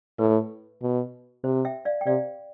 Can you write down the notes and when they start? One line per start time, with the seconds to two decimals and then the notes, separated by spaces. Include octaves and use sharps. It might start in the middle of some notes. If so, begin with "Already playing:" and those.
0.19 A2 B4
0.82 B2
1.44 C3 C5
1.65 E5 G5
1.85 D5 F5
2.01 G5
2.06 C3 D5 F5